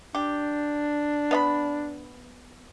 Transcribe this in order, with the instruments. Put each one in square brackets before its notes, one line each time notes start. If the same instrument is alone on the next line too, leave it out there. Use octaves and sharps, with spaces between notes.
[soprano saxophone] D4 [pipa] G4
[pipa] B3 D#5 B5